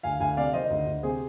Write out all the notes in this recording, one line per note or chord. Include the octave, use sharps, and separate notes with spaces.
D2 F5 G#5
D2 F5 G#5
C3 D5 F5
D#3 C5 D#5
D2
D2
C3 G#4 C5